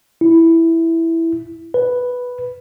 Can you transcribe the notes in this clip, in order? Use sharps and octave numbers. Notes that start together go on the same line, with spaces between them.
E4
B4